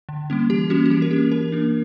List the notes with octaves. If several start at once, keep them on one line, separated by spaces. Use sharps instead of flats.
D3
G3 A#3 C#4
E3 G4
G3 A#3 C#4 F#4
F#4
E3 G4
A#4
A#3 C#4 G4
E3 A#4
A#3 D4